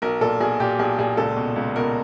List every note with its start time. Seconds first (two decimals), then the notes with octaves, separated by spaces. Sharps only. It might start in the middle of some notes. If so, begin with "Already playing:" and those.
0.02 B1 A#4
0.21 A#2 A4
0.40 B1 G#4
0.60 A#2 G4
0.79 B1 G#4
0.99 A#2 G#4
1.17 C#2 A4
1.37 B2
1.56 C#2
1.76 B2 A#4